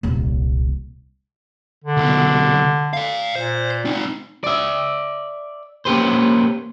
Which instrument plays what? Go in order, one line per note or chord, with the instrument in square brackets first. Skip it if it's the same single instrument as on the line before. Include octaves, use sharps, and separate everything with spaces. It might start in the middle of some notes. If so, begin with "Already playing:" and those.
[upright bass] D#1 C2
[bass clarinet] D3
[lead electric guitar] C2 B2
D5 F5
[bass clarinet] A#2 [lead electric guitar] C5
[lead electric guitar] C4 D#4
[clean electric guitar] D5 E5
A#3 C#4 G4 B4 C5